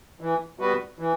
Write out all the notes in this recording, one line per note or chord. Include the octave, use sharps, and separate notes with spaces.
E3
G3 B3 F#4 B4
E3